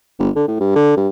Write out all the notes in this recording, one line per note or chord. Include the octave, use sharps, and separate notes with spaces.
G1
D3
A2
G2
D3
G2